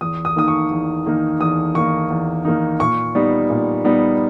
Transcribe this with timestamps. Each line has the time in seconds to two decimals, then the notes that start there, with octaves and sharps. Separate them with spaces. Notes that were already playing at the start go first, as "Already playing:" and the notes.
0.01 E2 D#6
0.25 D#6
0.36 D#3 A#3 D#4 D#6
0.48 C#6
0.71 E2
1.06 D#3 A#3 D#4
1.40 E2 D#6
1.75 D#3 A#3 D#4 C#6
2.10 E2
2.45 D#3 A#3 D#4
2.80 A#2 C#6
3.15 G3 B3 D#4
3.50 A#2
3.85 G3 B3 D#4